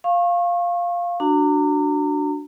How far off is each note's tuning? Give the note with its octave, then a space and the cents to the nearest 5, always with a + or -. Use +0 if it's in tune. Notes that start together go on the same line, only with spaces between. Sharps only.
F5 +0 C#6 -30
D4 +0 F#4 +0 A#5 -35